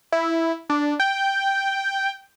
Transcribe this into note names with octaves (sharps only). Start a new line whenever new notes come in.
E4
D4
G5